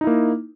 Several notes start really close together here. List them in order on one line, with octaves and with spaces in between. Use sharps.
D#4 E4 A#3